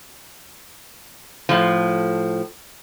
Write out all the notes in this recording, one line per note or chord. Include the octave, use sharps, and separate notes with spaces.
A2 F3